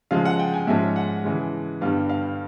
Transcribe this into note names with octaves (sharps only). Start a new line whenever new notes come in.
C#3 F3 G#3 F5
F#5
G5
G#5
G#2 F3 G#3 C#4 E5
F#5
C#3 E3 G#3
G2 D3 G3 B3 F5
F5